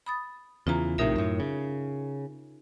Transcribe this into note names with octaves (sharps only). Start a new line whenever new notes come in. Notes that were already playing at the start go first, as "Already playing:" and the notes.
B5 D#6 A6
E2 C#3 E3 F4 A#5
A#1 A2 C3 D#4 A#4 E5
F#2 A2
C#3